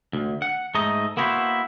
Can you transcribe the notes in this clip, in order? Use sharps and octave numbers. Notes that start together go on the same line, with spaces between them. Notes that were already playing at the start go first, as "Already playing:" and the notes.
D2
F#5
G#2 A3 D#4 D#5
A#3 B3 E4 F#4 A4 C5